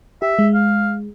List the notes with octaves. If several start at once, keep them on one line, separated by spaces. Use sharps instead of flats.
G4 E5
G#3
F5